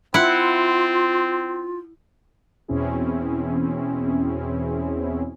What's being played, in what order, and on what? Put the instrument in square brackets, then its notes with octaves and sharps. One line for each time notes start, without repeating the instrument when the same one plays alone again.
[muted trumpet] C4 [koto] E4 F#5 [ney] F4
[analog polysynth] E2 B2 C4 C#4 E4 G#4